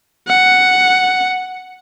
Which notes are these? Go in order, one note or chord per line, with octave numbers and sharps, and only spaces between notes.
F#5